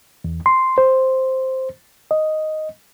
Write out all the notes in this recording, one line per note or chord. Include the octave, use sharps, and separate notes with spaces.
E2
C6
C5
D#5